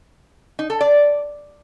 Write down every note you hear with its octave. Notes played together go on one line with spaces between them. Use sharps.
D#4
A4
D5